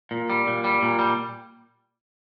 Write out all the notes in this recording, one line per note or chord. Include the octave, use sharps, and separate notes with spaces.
A#2
G3
A#2
G3
A#2
G3